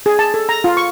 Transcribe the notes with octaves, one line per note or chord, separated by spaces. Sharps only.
G#4
A5
A4
A#5
F4
C#6